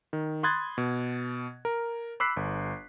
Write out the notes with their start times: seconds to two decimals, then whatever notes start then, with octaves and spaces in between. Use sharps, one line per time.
0.13 D#3
0.43 B5 C6 D#6 F#6 G#6 A6
0.78 B2
1.65 A#4
2.20 B5 D6 E6 F#6 B6 C7
2.36 G1